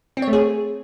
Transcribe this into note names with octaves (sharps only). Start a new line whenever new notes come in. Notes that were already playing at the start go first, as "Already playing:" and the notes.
C4
C#5
A3
G#4